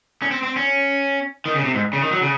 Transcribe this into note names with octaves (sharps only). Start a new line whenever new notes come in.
C#4
C4
C4
C#4
D#3
C#3
C3
G#2
C#3
D#3
F#3
C#3